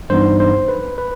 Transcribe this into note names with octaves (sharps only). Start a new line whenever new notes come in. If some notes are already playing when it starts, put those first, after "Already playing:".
G2 E3 B3 D#4 C5
C5
B4
B4